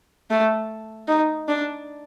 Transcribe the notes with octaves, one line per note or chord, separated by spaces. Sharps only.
A3
D#4
D4